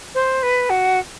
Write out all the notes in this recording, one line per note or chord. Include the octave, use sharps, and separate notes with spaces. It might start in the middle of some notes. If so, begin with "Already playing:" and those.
C5
B4
F#4